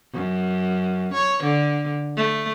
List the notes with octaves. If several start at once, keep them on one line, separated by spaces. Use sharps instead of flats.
F#2
C#5
D3
A3